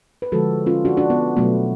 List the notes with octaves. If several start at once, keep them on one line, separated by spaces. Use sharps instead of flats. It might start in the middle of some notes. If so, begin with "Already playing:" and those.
B4
D3 F3 G#3 F#4 A4
C#4 F4
D4 F#4
D4 F#4
B3
B2 F#3 A3 B3